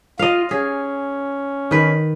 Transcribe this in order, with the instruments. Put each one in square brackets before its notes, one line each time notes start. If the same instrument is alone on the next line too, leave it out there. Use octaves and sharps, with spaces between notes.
[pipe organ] F4 [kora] D#5 F5
[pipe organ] C#4 [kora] G#4
[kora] D#3 B4